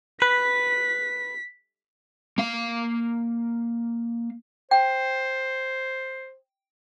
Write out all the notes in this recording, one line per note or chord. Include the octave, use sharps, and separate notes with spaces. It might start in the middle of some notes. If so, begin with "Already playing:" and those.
B4 B6
A#3 F5
C5 G5